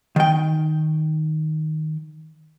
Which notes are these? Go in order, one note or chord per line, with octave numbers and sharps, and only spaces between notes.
D#3 G5